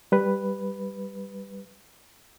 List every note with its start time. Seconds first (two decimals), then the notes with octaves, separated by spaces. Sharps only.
0.12 G3 B4